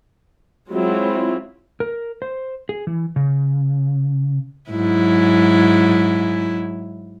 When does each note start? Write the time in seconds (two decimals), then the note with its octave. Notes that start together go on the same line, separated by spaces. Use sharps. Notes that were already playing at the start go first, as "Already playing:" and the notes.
0.71 F#3 G#3 C4 E4 F4
1.80 A#4
2.22 C5
2.69 G#4
2.87 E3
3.16 C#3
4.70 G#2 F#3 E4